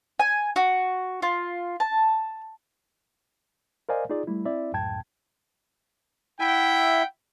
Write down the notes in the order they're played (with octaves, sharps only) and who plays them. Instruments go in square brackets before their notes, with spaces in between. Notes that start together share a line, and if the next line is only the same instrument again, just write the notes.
[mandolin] G#5
F#4
F4
A5
[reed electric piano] A#4 C5 D5 D#5 F5 G#5
D#4 F4 G#4 D5
G3 A3 E4
C4 E4 D5 E5
C#2 F#2 A2 G5 A5 G#6
[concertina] E4 E5 [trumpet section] F#5 G5